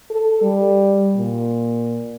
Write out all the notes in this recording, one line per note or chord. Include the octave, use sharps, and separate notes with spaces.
A4
G3
A#2